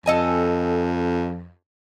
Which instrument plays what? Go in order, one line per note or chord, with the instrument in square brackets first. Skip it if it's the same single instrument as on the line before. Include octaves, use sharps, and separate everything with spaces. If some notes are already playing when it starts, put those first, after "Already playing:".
[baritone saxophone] F2 [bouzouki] A4 D#5 G#5